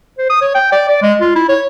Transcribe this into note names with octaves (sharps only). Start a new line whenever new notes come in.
C5
D#6
C#5
G5
D5
D5
G#3
F4
E4
C#5